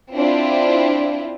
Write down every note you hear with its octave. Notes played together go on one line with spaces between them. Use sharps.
C4 D4 E4 F4